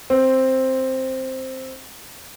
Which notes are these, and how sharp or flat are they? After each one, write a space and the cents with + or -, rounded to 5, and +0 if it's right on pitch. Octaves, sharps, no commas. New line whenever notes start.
C4 +5